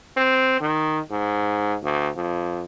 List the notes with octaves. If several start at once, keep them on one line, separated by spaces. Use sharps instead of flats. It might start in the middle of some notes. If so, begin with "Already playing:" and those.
C4
D#3
G#2
D2
F2